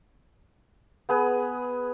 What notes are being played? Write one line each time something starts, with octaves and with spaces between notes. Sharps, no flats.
B3 G#4 B4